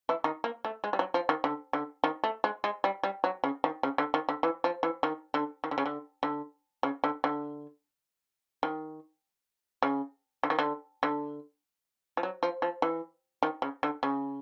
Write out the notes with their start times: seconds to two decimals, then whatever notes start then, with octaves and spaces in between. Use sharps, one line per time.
0.09 E3 E4
0.24 D#3 D#4
0.44 A#3
0.65 A3
0.84 G#3
0.93 G3
0.99 F#3
1.14 F3
1.29 D#3
1.44 D3
1.73 D3
2.04 D#3
2.24 A3
2.44 G#3
2.64 G#3
2.84 G3
3.03 G3
3.24 F#3
3.44 C#3
3.64 D#3
3.83 C#3
3.98 D3
4.14 D#3
4.29 D3
4.43 E3
4.64 F3
4.83 E3
5.03 D#3
5.34 D3
5.64 D#3
5.71 D3
5.78 C#3
5.86 D3
6.23 D3
6.83 C#3
7.04 D3
7.24 D3
8.63 D#3
9.83 C#3
10.43 D3
10.50 D#3
10.59 D3
11.03 D3
12.17 F3
12.23 F#3
12.43 F3
12.62 F3
12.82 E3
13.43 D#3
13.62 C#3
13.83 D3
14.03 C#3